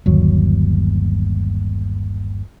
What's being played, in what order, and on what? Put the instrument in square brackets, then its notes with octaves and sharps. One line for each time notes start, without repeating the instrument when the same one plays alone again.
[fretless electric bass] G1 D#2 F#3